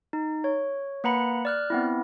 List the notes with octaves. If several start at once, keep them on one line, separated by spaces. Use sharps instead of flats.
D#4
C#5
A#3 B4 F#5 A#5 B5 C#7
D5 F6 F#6
B3 C4 E4